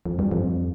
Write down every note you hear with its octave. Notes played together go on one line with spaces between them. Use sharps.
F2
G2
F2